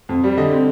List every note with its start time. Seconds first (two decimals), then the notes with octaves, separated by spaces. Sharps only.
0.09 F2
0.24 G3
0.37 D3 D#5
0.51 C4